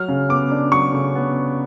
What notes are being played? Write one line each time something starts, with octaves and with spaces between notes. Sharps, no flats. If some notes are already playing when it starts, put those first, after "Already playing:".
Already playing: F#3 F6
C#3
B3 D6
D4
F#3 C#6
C#3
B3